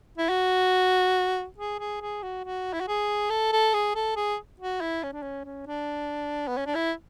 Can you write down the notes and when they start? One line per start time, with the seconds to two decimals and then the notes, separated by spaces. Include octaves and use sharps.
0.18 E4
0.29 F#4
1.58 G#4
1.80 G#4
2.02 G#4
2.23 F#4
2.45 F#4
2.73 E4
2.80 F#4
2.88 G#4
3.30 A4
3.53 A4
3.74 G#4
3.95 A4
4.16 G#4
4.60 F#4
4.81 E4
5.03 C#4
5.13 D4
5.22 C#4
5.45 C#4
5.67 D4
6.48 B3
6.57 C#4
6.66 D4
6.75 E4